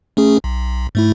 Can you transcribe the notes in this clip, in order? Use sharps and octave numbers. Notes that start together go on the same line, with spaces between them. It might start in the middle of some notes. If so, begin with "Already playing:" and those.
A3 C#4 G#4
B1
G#2 A3 E4